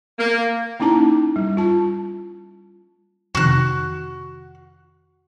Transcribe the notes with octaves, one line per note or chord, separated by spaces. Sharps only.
A#3
A#3 C#4 D#4 E4 A5 A#5
G3
F4 A5
F2 C3 D#3 F#4 F#6